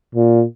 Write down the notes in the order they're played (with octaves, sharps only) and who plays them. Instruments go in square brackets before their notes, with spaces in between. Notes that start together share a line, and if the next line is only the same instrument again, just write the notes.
[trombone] A#2